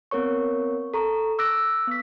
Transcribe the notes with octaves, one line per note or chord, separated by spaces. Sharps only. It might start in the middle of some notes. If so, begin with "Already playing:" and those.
B3 C4 A#4 C#5 C#6
A4 A#5 C#6
D6 E6 F#6 A#6 D7
B3 B6